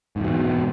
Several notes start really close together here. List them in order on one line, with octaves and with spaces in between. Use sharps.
G#2 E2 B2